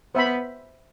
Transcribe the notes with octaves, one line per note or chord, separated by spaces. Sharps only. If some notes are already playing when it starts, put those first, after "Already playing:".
B3 C5 E5 B5